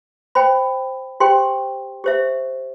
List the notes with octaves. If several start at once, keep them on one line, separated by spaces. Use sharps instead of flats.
C5 G5 B5
G4 C5 G5 C6
G4 C5 E5